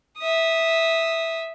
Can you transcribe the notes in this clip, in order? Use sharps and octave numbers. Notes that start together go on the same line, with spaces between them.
E5 D#6